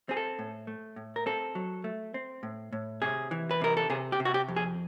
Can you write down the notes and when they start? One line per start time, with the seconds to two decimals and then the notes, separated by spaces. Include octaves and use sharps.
0.09 C4 G#4
0.17 A4
0.39 A2
0.67 A3
0.96 A2
1.16 A#4
1.26 C4 A4
1.55 F#3
1.84 A3
2.14 C4
2.43 A2
2.73 A2
3.02 C3 G#4
3.31 E3
3.51 B4
3.61 C3 A#4
3.77 A4
3.90 C3 G#4
4.12 G4
4.20 C3
4.25 F#4
4.34 G4
4.49 F2
4.56 G#4